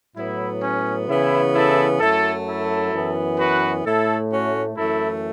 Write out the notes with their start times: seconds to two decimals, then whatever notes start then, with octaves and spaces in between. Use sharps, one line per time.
0.16 A2 F#3 B3 E4
0.62 C#4
1.08 C#3 E3 B3 E4
1.54 E4 A4
2.00 F#2 F#3 A3 E4 A4
2.46 E4 A4
2.92 F#2 E3 B3
3.39 F#4 B4
3.85 A2 A3 E4 A4
4.31 C#4 F#4
4.77 F#2 E3 A3 E4 A4